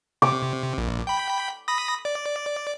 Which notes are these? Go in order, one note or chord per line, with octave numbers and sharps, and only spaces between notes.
C3 D6
A#1
G5 B5
B5 D#6 A#6
D5